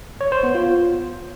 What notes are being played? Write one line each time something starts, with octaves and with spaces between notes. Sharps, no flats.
C#5
C5
B3
F4